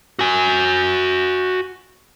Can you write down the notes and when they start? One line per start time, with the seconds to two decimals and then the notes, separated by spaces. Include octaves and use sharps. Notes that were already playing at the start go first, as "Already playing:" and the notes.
0.19 F#4 G#5